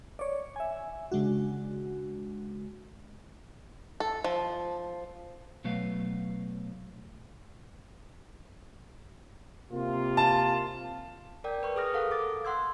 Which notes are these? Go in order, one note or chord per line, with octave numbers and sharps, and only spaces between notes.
C#5 D5
E5 G#5
C#3 G#3 D4 F#4
A4
F3
B2 F#3 A3 B4 F5
C3 A#3 F4
A5
A#4 D5 G5
B4 C#6
G#4 B4 D#6 F6 A#6
A4 A#4 F5 F#5
A4 D6 A6
F#5 C6 E6 G#6